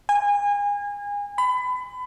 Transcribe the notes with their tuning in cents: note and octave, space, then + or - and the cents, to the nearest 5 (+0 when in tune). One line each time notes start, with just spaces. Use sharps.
G#5 -30
B5 +30